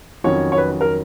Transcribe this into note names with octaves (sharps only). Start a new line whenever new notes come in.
F2 D#3 F#3 C#4 C#5
C#5
B4
A#4